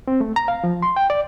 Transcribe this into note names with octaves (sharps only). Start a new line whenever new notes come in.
C4
A3
A#5
F5
F3
C6
G5
D5